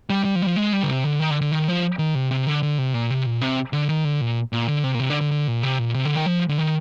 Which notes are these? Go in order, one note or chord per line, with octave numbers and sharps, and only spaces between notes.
G3
G3
F3
G3
F3
G#3
G3
D3
C3
D3
D#3
D3
D3
D#3
F3
D#3
C3
C3
D3
D3
C3
A#2
C3
A#2
C3
D3
D#3
D3
A#2
A#2
D3
C3
A#2
C3
D3
D3
D3
A#2
C3
A#2
C3
D3
D#3
F3
D3
D#3